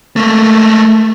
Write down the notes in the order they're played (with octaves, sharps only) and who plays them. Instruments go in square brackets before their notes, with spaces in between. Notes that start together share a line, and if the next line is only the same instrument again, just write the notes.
[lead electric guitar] A3 A#3